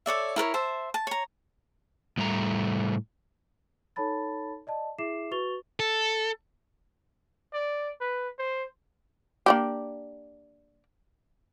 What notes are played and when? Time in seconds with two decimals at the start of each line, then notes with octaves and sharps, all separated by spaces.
0.06 A4 C#5 D5 E5
0.36 E4 A#4 B4 C#5
0.54 C5 E5 A5
0.94 A5
1.07 C#5 A#5
2.18 A2 G3 A3 G5 A#5
3.96 D#4 A4 C#5 A5 B5 A6
4.67 D5 D#5 A5
4.98 E4 G#4 E5 D6 C7 E7
5.31 F#4 B4 C#6 A6 F7 G7
5.80 A4
7.53 D5
8.01 B4
8.39 C5
9.46 A#3 D4 G4